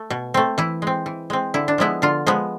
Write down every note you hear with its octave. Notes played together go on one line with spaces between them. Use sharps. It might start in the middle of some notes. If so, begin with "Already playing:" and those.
Already playing: A3
B2
A3 C4
E3 E4
G#3 C4
E3
G#3 C4
D3 E4
D4
F3 G#3 B3 E4
D3 F4
F3 G#3 B3